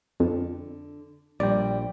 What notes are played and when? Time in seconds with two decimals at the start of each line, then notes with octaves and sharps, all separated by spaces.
0.20 F2 D3
1.40 A#1 G3 D5 G5